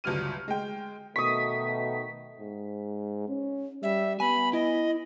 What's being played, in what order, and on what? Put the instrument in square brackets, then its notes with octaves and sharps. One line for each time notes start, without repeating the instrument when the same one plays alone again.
[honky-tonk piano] G1 C#2 F#3 G3 F6 D#7
G#3 G5
[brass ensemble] B2 D#3 A3 [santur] C#6 D#6 [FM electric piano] B6
[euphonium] G#2
C#4
[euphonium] G3 [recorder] E5
[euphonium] B3 [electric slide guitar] G#5 [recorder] B5
[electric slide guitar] E4 [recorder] D#5